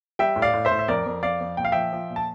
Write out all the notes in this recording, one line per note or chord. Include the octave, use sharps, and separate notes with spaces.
G3 E5 G5
A2
D5 F5
A2
C5 E5
A2
E5
F2 A#4 D5
F2
F2 D5 F5
F2
A#2 G5
F5
F3 E5 G5
F3
A#2
A5